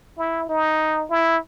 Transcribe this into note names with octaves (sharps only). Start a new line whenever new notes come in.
E4
D#4
E4